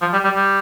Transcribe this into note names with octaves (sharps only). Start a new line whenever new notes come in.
F3
G3
G3
G3